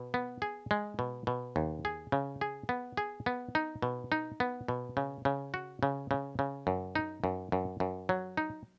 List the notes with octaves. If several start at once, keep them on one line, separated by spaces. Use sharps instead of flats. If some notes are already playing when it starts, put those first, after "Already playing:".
Already playing: B2
B3
G#4
G#3
B2
B2
D#2
G#4
C#3
G#4
B3
G#4
B3
D#4
B2
D#4
B3
B2
C#3
C#3
F#4
C#3
C#3
C#3
F#2
D#4
F#2
F#2
F#2
F#3
D#4